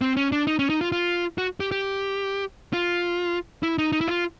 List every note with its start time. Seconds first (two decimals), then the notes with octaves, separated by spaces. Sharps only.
0.01 C4
0.16 C#4
0.32 D4
0.47 D#4
0.59 C#4
0.70 D#4
0.81 F4
0.92 F4
1.38 F#4
1.60 G4
1.71 G4
2.73 F4
3.63 E4
3.78 D#4
3.92 D#4
4.01 E4
4.08 F4